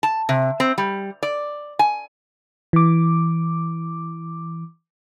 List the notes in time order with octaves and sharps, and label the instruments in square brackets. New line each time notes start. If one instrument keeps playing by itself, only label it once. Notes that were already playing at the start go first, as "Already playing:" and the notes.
[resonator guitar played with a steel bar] A5
C3
C4
G3
D5
G#5
[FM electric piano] E3 D6